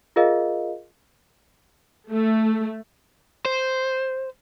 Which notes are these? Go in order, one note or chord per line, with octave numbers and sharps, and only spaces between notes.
F4 G#4 A#4 D#5 F5
A3
C5